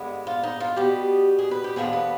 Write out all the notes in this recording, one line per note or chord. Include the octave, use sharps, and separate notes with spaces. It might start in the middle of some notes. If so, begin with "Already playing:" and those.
Already playing: G2 D3 G#3 B3
F4
D#4
F4
B2 G3 B3 G4
G#4
B4
G4
D#2 D3 F3 G#3 B3 G#4
B4